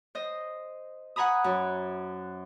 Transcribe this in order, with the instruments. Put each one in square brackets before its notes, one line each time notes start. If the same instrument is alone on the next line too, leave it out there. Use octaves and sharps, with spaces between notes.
[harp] C5 D#5
F#5 G#5 A#5 B5 D#6
F#2